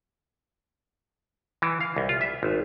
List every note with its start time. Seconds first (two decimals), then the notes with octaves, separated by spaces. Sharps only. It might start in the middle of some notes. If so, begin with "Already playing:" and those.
1.62 E3
1.81 F5
1.96 C2
2.09 F4
2.21 E5
2.43 G#1